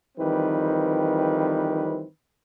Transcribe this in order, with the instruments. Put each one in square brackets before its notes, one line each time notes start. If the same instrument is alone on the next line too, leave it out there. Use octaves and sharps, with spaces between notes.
[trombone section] F2 D#3 E3 G3 C4 B4